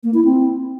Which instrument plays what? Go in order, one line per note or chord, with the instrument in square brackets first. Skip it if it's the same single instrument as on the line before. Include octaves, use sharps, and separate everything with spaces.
[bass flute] A#3
E4
C4